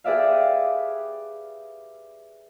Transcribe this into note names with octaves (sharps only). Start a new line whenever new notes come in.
G4 G#4 B4 D5 E5 F5